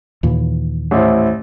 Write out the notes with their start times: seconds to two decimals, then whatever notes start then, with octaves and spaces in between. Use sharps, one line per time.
0.23 D#2 A#2 E3
0.91 A1 E4 C5